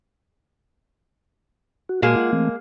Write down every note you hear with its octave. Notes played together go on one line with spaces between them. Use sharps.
F#4
A#2 G#3 A#3 F#4 G#4
F4 F#5
E3 A3 C4